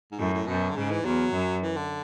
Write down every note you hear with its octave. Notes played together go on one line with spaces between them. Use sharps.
G#2
F#2 A2
A2
F#2 B2
D3
G#2 C#3
E3
E2 F#3
F#2
E3
D3